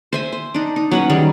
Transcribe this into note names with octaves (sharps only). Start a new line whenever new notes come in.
C5 E5 G#5
C5
D4 D#4
D#4
F#3 C#4 B4
D#3 G3 G#4